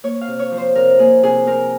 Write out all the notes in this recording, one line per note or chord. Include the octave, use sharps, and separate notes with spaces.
A#3 C#5
F5
C3
C#5
F3
C5
C3 A#4
A#3 G#4
C3 G#4
C4 A#4